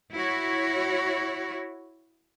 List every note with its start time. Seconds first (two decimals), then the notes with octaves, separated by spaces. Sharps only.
0.14 E4 F#4 C#5